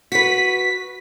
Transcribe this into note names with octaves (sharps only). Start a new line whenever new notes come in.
F#4 B4 B6